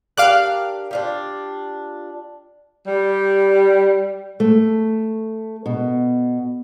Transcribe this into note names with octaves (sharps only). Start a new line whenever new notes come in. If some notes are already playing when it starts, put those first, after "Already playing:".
D4 G4 A#4 F5 D6 F#6
D4 F4 G4
G3
A3
B2